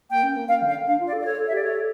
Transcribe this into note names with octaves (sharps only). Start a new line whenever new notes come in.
A#3 G5
C#4
A#3
A#3 F5
D3
F5
D4 F5
F4
D5
A4
D5
A4 C#5
A4
E5
G4 D5
A4 C#5